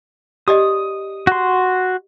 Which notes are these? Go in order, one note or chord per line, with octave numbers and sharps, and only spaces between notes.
G4 D5 D#5 D#6
F#4 C6